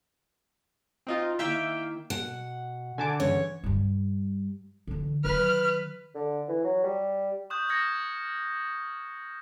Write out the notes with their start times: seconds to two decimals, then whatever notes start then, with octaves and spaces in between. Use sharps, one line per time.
1.07 C4 D#4 F4
1.39 D#3 A#3 E4 E5 F5 G5
2.10 B2 F#5
2.98 D3 G#5 A5 D6
3.20 G2 C#3 E3 C#5
3.64 G2 G3
4.87 D3 E3
5.24 D#3 F#3 B4 F6
6.15 D3
6.48 E3
6.64 F#3
6.84 G3
7.50 C#6 D#6 F#6 G6
7.69 D#6 F6 G6 G#6 A#6 C#7